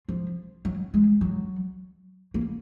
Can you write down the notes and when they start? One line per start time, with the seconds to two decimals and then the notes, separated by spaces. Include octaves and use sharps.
0.09 F3
0.65 F#3
0.94 G#3
1.21 F#3
2.34 A#3